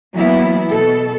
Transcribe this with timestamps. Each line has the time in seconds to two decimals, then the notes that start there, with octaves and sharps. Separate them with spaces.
0.15 E3 F#3 A#3 B3 E4
0.71 B2 A4